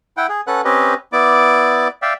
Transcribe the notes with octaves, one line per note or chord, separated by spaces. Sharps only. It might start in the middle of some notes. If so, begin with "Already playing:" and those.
E4 F#5 G5
G#4
C#4 A4 B4 F#5 F#6
C4 C#4 G4 B4 D#5
B3 E4 D5 D6
D5 E5 F5 G5